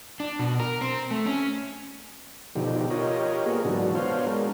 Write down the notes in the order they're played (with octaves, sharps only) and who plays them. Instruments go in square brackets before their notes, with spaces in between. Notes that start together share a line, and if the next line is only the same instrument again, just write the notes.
[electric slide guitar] D4
B2
A#4
C4
A3
C#4
[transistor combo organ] B2 D3 F3 D#4 G4
F4 G4 A#4 C#5 D#5
A#3 B3 F4 G#4 A#4
G#2 D3 E3 F#3 D4 F#4
B3 D4 C5 C#5 F5
G#3 D4 A#4